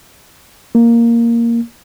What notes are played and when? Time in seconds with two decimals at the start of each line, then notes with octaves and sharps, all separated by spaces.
0.75 A#3